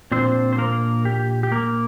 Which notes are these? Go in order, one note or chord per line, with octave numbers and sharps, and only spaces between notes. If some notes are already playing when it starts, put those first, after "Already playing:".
A#2 F3 C4 D4 C5
C5
A#3 A#4
G4
G4
A#3 A#4